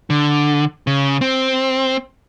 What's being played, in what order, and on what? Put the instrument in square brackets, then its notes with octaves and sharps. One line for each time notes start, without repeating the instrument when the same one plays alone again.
[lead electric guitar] D3
C#3
C4